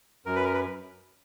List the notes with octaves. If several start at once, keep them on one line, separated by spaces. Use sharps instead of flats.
F#2 A#4
B4
A#4
B4